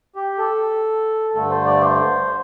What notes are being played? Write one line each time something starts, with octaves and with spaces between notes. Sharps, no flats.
G4
A4
G2 D3 A3 A4
C5
D5
C5